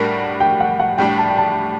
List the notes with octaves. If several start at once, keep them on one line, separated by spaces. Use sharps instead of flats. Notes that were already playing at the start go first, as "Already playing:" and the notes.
Already playing: A2 G3 D4 F#4 A#4
G5
F#5
F#5
A2 G3 D4 G5
A5
G5
A5